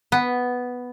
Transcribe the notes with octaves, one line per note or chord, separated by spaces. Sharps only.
B3